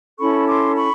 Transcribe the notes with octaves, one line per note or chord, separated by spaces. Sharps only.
C#4 E4 A4 B5 C#6
C6 D6
B5 C#6